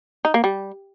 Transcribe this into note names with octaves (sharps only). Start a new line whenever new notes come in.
D#4
A#3
G3